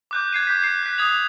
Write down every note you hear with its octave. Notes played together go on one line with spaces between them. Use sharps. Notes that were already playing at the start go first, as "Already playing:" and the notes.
D6 F#6 G6
G#6 C7 D#7
D6 G6 B6
F#6 C7
F#6 B6
D#6 G#6 F7